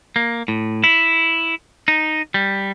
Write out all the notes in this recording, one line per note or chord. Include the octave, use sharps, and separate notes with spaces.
A#3
A2
E4
D#4
G3